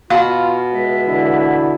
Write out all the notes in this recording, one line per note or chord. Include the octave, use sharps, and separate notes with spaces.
B2 F4 F5 F#5
C#2 G#3 E5
D3 E3 E4